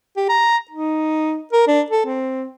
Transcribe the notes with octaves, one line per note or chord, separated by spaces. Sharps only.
G4
A#5
D#4
A#4
D4
A4
C4